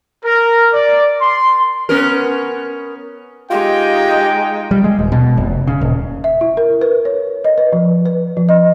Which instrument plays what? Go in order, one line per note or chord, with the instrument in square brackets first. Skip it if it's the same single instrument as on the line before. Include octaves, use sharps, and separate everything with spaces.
[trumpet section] A#4
D5
C6
[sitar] B3 C#4 A#4
[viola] G#3 D#4 [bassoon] F4 [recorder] G4 [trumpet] G5
[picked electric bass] G3
G#3
D#1
B2
F1
C#3
D#1
[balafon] E5
E4
A#4
B4
C#5
D#5
B4
F3
B4
F3
D#5